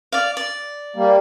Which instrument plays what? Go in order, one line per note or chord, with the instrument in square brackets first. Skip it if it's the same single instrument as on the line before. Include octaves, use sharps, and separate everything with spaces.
[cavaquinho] D5 F5
D5
[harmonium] G3 A#3